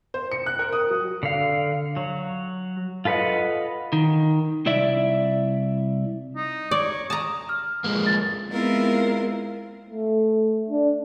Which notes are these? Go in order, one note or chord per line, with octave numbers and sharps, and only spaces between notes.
C5
C#7
F#6
A#4
D#6
F#3
D3 F5
F#3
F4 A4 B4 D#5 F#5
D#3
C2 E4 D5 E5
D#4
C#5 D5
A5 A#5 D#6
F6
F3 G#3 A#3
A6
G#3 B3 C4 E4 F4 A#4
A3
D4